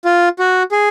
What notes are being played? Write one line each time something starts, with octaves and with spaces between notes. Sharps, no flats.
F4
F#4
G#4